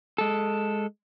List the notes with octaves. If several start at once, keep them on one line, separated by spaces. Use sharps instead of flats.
G#3 A4